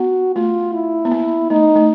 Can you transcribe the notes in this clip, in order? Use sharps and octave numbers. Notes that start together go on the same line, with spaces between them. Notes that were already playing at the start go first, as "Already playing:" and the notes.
Already playing: B3 F#4
A3 F4
E4
B3
A#3
A3 D#4
A3